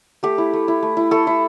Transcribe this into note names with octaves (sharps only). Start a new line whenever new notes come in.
A3 G4
E4
A3
E4
A3
E4
A3 A4
E4